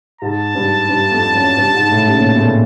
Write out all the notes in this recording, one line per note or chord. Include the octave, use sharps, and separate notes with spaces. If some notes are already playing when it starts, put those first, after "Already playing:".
G#2 A5
G2
G2
F2
F#2
G2
G#2
A2
C#3
A#2
B2
A2
A#2